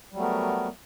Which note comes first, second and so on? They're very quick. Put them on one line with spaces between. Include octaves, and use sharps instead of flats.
G3 F#3 A3 B3 A#4